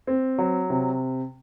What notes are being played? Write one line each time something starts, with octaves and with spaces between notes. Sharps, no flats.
C4
F#3
C3